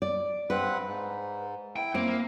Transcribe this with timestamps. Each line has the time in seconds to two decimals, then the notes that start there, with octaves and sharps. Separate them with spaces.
0.02 D5
0.50 G2 C4 B4 F#5
0.88 G#2
1.76 E4 G5
1.95 A#3 C4